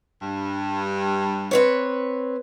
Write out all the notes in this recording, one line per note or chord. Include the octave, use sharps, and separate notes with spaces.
G2
C4 B4 C#5